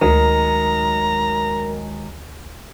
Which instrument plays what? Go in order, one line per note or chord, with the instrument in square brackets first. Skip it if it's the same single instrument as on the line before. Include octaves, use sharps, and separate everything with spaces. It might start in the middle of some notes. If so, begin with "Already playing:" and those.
[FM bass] D2 [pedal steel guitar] D#3 F#3 G#3 [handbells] A#4 [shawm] A#5